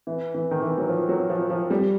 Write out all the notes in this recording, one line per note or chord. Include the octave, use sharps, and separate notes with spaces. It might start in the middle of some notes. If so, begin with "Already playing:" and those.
E3
E3
D#3
E3
F#3
F3
F#3
F3
F3
G3